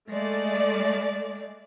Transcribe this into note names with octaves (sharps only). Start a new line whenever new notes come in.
G#3 A3 D5